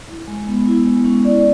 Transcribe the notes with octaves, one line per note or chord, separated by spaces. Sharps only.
E4
G#3
B3
E4
G#3
C#4
D5